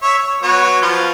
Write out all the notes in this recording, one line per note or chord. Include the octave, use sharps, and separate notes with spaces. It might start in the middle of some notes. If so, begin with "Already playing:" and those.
C#5 E5
C#5
F#3 B3 C#5
F3 B3 F4